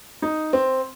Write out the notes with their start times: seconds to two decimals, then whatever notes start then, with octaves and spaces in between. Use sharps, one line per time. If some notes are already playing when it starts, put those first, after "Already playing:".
0.22 D#4
0.53 C4